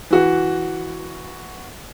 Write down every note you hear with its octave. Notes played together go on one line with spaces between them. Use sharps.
E3 F#4